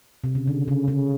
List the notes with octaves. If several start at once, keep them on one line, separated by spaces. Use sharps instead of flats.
C3
C#3
D3
C#3
C#3